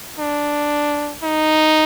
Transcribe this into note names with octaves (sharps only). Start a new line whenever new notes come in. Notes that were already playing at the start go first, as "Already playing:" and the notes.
D4
D#4